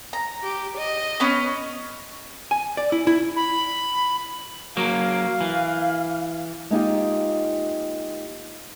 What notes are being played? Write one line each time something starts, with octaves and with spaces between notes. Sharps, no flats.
A#5
G4
D#5
B3 C#4
G#5
D5
E4
E4
B5
F#3 A#3 F5
E3
G#3 A#3 D#4 F4 G4